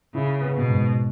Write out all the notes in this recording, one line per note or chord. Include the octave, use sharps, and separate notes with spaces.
C#3 E4
B3
B2
G#2